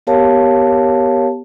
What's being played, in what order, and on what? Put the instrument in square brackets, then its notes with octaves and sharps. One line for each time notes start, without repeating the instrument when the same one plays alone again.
[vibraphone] B3 G4 A#4 C#5 F5 A5